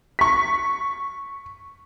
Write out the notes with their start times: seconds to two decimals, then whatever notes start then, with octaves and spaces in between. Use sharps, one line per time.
0.19 C#6 B6